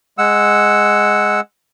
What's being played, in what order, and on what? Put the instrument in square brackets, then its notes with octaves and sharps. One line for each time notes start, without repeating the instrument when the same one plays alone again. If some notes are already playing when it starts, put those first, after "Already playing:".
[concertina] G#3 F#5 E6